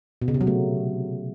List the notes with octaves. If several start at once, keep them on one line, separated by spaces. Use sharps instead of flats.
B2
C#3
C3
F#3
A3